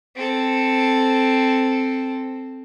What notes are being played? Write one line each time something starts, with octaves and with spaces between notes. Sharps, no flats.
C4 A4